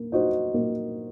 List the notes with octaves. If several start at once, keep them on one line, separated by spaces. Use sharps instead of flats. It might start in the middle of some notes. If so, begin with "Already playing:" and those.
Already playing: A#3
D#4 F#4 C5 D#5
A#3